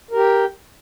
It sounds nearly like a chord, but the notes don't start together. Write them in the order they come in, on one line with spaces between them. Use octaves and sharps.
A#4 G4 G5